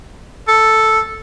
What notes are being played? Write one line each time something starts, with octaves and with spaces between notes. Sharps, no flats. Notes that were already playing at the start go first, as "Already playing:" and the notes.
A4